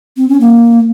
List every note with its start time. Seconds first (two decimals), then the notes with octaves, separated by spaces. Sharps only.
0.17 C4
0.29 C#4
0.41 A#3